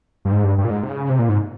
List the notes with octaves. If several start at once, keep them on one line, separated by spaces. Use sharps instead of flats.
G2
G#2
G2
G2
A#2
G#2
C3
C#3
C3
A#2
G#2